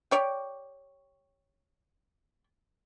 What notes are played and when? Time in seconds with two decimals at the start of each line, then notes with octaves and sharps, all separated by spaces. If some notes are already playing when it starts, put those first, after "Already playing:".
0.11 G4 C#5 D5